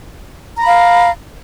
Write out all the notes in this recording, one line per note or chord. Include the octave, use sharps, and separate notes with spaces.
F5 A#5 B5